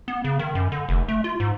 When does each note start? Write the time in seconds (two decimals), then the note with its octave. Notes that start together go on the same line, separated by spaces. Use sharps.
0.08 B3
0.24 C#3
0.39 D#3
0.55 F#2
0.72 D3
0.89 F1
1.08 A3
1.24 F4
1.40 G#2